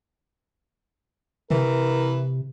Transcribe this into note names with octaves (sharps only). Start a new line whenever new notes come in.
C3 E3 A#4